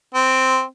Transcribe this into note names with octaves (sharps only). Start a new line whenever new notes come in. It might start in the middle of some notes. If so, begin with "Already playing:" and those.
C4